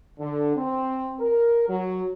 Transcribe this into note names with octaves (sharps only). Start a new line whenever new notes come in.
D3
C4
A#4
F#3